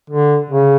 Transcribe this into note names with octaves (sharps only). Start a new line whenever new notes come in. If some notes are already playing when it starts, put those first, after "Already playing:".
D3
C#3